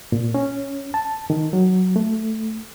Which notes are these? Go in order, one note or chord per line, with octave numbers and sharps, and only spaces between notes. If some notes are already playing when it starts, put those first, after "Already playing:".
A#2
C#4
A5
D#3
F#3
A3